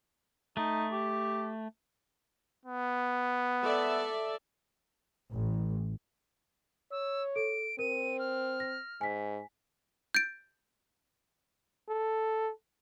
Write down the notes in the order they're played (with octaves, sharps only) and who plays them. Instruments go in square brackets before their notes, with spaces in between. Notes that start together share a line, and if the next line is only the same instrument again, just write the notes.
[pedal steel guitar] A3 [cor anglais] D#4
[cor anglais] G4
[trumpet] B3
[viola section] A4 D5 E5
[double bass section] A1
[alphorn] C#5 [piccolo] E6
[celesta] A4 [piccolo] D7
[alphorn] C4 [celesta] A#4 [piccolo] D#7
[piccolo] F6
[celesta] A#6
[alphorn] G#2 [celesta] G#5 B6
[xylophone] G6 A6 D7
[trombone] A4